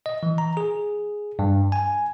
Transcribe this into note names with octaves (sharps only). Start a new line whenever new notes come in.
D#5
E3
A#5
G#4
G2
G#5